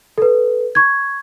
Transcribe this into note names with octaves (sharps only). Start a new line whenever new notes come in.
A4 B4
C#6 G#6